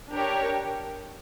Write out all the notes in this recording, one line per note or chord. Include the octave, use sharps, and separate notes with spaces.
D4 G4 A#4 C#5